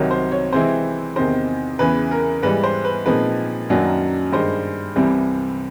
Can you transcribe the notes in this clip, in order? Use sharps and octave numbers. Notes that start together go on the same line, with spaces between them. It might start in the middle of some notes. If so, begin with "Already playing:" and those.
Already playing: C2 C3 D#3 F#3 C#5
C5
C#5
C3 E3 G#3 C4 E4 C5
E2 C3 D#3 C5
E2 C#3 E3 B4
A#4
G#2 E3 G3 B4
C5
B4
A#2 F3 G#3 C4 D#4 B4
F#2 D#3 F#3 A#3 D4
G2 D#3 G#3 C5
C2 C3 E3 G3 C4